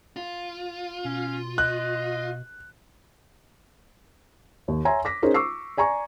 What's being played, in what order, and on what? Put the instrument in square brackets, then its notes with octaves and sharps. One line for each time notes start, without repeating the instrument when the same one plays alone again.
[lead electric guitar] F4
[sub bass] B2 [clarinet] C#4
[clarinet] D#5 [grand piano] F#6
[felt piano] D#2
C#5 E5 G#5 A#5 C6
D6 A#6 B6
C#4 D#4 G#4 A#4 C5
C#6 D6 E6 C7
D5 G#5 A#5 C#6